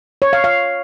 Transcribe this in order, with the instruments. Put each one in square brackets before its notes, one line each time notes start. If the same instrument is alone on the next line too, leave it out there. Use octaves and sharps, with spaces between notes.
[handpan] C#5
F5
F5